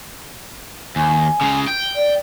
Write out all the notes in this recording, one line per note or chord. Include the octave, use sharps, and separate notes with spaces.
D#2 G#5
C#2 C#3
G5
D5